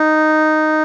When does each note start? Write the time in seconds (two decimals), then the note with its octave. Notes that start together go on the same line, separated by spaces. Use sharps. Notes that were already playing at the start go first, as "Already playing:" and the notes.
Already playing: D#4